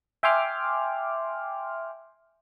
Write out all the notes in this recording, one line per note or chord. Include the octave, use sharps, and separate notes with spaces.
E5 G5 G#5 C6 D6 F6